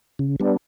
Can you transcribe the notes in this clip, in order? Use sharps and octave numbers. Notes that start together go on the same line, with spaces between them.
C#3
G3 B3 D4